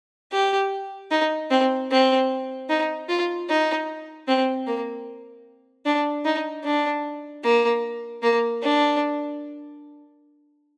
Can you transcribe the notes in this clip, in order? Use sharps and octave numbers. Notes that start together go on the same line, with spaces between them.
G4
D#4
C4
C4
D#4
F4
D#4
C4
A#3
D4
D#4
D4
A#3
A#3
D4